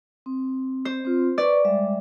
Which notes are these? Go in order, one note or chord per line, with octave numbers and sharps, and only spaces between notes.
C4
C5
C4 F4
B4 D5 C#6
G3 G#3 E5